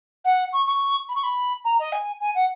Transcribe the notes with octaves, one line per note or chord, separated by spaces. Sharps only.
F#5
C#6
C#6
B5
C#6
B5
A#5
D#5
G#5
G#5
F#5